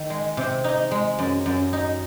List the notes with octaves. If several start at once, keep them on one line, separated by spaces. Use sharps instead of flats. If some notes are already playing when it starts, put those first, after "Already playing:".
Already playing: D#3
G#3
C3
D#4
G#3
F#2
F#2
D#4